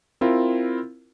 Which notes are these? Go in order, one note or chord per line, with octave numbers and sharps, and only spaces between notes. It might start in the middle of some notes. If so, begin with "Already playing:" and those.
C4 E4 F4 A#4